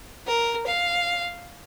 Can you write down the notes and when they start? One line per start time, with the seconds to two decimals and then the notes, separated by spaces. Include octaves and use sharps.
0.27 A#4
0.66 F5